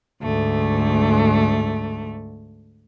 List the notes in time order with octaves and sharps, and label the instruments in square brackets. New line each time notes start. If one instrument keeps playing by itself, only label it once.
[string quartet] D2 G#2 A3